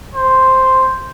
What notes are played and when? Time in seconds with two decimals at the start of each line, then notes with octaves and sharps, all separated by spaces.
0.15 C5